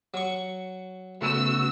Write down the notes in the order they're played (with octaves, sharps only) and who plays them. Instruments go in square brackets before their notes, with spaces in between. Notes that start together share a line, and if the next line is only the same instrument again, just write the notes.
[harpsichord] F#3 C#6
[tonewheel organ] C#3 F#4 [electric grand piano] A3 B3 [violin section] E6